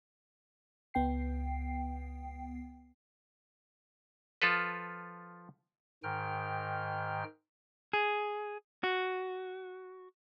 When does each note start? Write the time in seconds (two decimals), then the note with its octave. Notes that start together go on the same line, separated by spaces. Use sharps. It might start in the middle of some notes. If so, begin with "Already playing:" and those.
0.94 C#2 B3 G5 C7
4.42 F3 F4 A4 B4
6.03 G#2 D#3 G5 F6
7.93 G#4
8.84 F#4